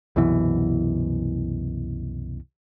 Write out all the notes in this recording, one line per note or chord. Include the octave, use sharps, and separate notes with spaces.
C2 F#2 B2 E3